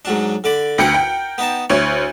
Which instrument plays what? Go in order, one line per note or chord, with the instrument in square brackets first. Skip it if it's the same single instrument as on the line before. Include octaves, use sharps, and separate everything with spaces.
[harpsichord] G#2 F#3 D4
D3 D5 B5
[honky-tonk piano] D2 G5 C#7 [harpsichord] A#4 F#5
[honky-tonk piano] G5
[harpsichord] B3 D#4 A5
[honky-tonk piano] D2 C#5 [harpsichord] E4